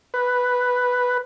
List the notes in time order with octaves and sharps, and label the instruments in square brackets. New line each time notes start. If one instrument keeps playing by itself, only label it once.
[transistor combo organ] B4